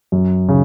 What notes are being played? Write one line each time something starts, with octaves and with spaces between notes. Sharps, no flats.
F#2
C#3